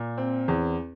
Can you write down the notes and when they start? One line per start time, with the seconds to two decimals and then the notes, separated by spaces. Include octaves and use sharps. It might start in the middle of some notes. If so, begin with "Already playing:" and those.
Already playing: A#2
0.18 C4
0.48 E2